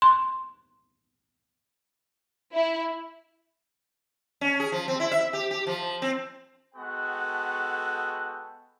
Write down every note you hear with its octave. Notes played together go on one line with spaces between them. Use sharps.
C6
E4
C#4
G#4
F3
C4
E4
E5
G4
G4
F3
C4
G#3 B3 F#4 A4 F#5 G5